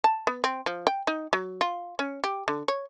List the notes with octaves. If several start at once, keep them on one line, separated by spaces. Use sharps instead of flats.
A5
B3
C4
F3
G5
D#4
F#3
F4
C#4
G4
D3
C#5